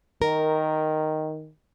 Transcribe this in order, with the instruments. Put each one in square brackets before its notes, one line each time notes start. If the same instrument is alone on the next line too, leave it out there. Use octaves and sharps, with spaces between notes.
[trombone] D#3 [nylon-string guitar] A#4